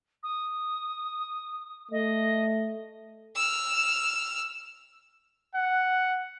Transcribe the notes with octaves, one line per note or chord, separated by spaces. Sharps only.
D#6
A3 D#5
E6 F6
F#5